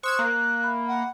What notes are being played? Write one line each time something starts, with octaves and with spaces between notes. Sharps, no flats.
C5 C6 C#6 D#6 E6 F#6 G#6
A#3 A#5
E5 B5
F#5